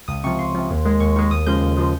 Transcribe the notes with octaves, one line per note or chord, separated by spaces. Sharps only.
C#2 D#6
C3 F3 C#6
C#2 C6
C3 F3
D#2
D#3 G#3
D#2 C#6
D#3 G#3 C#6
D#2 D#6
C#3 F3 G#3 G6
D#2
C#3 F3 G#3